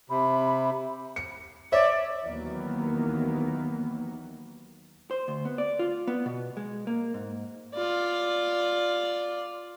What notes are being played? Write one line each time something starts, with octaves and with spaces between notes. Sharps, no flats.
C3 B5
C#7
C#5 D5 E5
D#2 D#3 E3 F#3 A#3 B3
C5
D2
B3
D5
F4
B3
B2
G#3
A#3
G#2
F4 D5